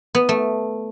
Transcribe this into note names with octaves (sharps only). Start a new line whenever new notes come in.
B3
A3